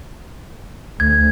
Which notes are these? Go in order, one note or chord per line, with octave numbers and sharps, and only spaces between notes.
D2 G#6